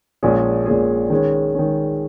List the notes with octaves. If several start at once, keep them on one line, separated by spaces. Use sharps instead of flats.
A#1 A#2 G#3 C#4 G#4
A#1 A#2 G#3 C#4 G#4
D#3 G#3 C#4
D#3 G#3 C#4